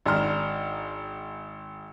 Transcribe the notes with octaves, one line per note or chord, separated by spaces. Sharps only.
G#1 D4 A#5 C6 F6